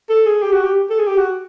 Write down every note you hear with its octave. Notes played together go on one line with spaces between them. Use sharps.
A4
G#4
G4
F#4
G4
A4
G#4
G4
F#4